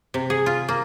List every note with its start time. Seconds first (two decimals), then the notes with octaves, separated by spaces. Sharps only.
0.14 C3
0.30 G#4
0.46 F4
0.69 A#3